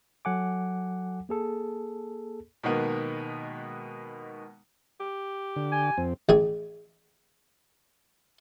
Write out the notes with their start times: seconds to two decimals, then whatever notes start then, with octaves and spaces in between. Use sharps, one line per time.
0.25 F#3 A4 F#5 G#5 D6
1.29 A#3 G#4 A4
2.63 B2 D#3 G#3 A#3 B3
5.00 G4
5.56 D3
5.72 G#5
5.98 F2 C4
6.29 A1 G#4 G#5